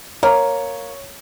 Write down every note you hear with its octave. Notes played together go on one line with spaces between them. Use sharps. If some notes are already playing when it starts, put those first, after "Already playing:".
A#3 C#5